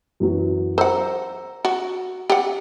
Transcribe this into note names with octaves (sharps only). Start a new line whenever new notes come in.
F#2 E3 F#3
A#4 C5 F#5 A#5 E6
F#4
G4 F#5